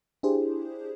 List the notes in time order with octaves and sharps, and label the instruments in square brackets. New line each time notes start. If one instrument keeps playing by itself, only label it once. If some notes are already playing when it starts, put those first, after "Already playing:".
[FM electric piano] D4 E4 G4 G#4 C5